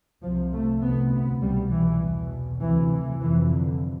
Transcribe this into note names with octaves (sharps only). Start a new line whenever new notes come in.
C2 C3 F3
A3
D2 C3 B3
B3
C2 B2 G3
E3
E2 B2
D2 C3 E3
E3
F2 C3 E3
D3